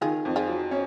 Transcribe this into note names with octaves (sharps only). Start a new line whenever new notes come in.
D#3 F4 G#4
F2
F4 G#4
F#3
C#4